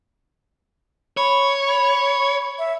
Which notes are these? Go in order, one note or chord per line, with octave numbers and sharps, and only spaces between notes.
C#5 B5
B5
E5